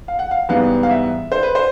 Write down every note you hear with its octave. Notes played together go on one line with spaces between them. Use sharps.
F5
F#5
F5
G#2 E3 G3 B3 F5
F5
E5
C5
B4
C5